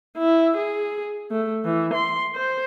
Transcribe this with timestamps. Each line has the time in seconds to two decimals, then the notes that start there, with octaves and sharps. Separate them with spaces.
0.18 E4
0.57 G#4
1.31 A3
1.65 E3
1.94 C6
2.35 C5